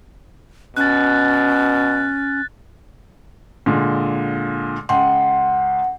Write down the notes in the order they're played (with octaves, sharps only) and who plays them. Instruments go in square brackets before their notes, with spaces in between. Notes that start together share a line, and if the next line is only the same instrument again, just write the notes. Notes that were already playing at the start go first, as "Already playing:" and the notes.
[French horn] B2 [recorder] C#4 [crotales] F#6 A6
[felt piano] A#2 D3 G#3
[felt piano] C#2 G5 C6 [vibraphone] F#5